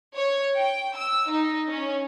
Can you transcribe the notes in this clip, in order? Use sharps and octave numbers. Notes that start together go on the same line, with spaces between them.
C#5
G5
E6
D#4
C#4